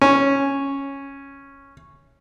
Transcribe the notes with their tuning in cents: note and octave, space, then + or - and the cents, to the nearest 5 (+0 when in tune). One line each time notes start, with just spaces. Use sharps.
C#4 -5